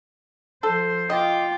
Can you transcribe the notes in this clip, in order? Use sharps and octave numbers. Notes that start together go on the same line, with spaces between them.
F3 A4 C5
F4 D#5 G5 D6